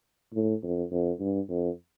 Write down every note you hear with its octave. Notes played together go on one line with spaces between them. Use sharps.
A2
F2
F2
G2
F2